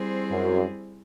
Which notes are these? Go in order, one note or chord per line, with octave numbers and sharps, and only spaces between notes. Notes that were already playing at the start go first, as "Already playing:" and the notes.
Already playing: G3 C4 E4 G#4 C5
F#2